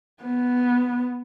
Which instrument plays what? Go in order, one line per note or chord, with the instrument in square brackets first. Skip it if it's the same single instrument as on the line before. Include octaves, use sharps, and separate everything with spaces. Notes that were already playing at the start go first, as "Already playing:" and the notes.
[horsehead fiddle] B3